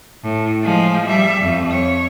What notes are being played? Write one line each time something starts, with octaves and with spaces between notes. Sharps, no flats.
A2
F3 G#3
G3 E5
F2
C#5